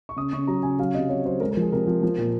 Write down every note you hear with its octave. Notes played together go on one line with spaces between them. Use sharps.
C#6
C#3 D#6
C#3 C#6
F#3 A#5
C#3 G#5
F#3 F5
C3 D#5
F#3 C#5
F#3 C5
G#3 A#4
A#4
F3 G#4
C3 A#4
F3
F3
A#2